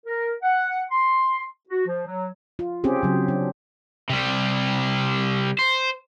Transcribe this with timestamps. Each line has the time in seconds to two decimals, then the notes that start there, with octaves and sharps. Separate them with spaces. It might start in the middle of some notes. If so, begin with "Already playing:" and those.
0.06 A#4
0.43 F#5
0.91 C6
1.70 F#4
1.86 F3
2.07 F#3
2.59 F4
2.84 C4 C#4 G4 G#4
3.03 C#3 F#3
3.28 D4
4.10 C3 G3
5.59 C5